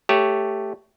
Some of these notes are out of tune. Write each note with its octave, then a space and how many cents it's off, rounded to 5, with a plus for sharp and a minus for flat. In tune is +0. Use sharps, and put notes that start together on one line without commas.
A3 +0 G4 +0 C#5 +0